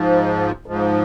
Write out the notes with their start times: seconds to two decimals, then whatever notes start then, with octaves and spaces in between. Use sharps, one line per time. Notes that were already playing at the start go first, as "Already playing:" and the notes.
Already playing: G#2 F3
0.66 G#2 F3